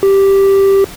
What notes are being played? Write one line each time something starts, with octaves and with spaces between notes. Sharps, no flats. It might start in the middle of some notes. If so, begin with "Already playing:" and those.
G4